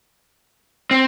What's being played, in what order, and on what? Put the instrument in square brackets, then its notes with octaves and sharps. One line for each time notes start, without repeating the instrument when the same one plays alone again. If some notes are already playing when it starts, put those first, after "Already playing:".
[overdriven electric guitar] C4